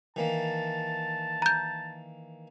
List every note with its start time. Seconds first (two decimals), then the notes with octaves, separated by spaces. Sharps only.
0.16 D#3 E3 A#3 A5
1.42 A#5 G6